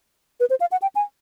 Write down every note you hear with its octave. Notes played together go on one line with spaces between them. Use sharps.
B4
C5
F5
F#5
G5
G#5